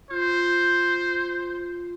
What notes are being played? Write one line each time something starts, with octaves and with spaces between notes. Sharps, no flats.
F4 C5